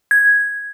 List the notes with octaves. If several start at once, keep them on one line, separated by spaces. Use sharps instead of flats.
G#6